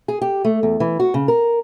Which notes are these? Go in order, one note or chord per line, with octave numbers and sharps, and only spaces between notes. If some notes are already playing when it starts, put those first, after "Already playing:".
G#4
G4
A3
E2
E3
F#4
C#3
A#4